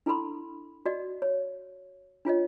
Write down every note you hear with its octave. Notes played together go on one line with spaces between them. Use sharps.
D4 E4 A4 B5 C6
F#4 D5 D#5
C#5
D4 F4 C#5 D#5